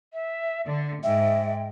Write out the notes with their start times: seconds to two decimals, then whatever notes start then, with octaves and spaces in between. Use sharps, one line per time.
0.13 E5
0.66 D3 D5
1.03 G#2 E5 G5